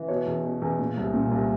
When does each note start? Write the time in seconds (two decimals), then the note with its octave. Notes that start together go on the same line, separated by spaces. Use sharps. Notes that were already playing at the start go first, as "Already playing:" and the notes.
Already playing: E3
0.08 B2 B4 C#5
0.26 E2
0.44 B2
0.62 E2
0.79 A#2
0.97 C2
1.14 A#2
1.31 C2